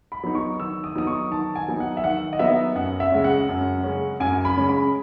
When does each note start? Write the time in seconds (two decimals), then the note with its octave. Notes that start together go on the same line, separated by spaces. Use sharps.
0.12 B5
0.24 F#3 B3 D#4
0.35 C#6
0.60 D#3 E6
0.84 D#6
0.95 F#3 B3 D#4 D#6
1.07 C#6
1.31 D#3 A5
1.56 G#5
1.68 F#3 B3 D#4
1.80 F#5
1.97 E5
2.04 D#3 F#5
2.33 D#5
2.39 F#3 B3 D#4 E5
2.75 F#2 F#5
3.00 E5
3.12 C#3 G#3 C#4
3.24 F#5
3.49 F#2
3.84 C#3 G#3 C#4
4.20 F#2 G#5
4.45 B5
4.57 C#3 G#3 C#4
4.69 B5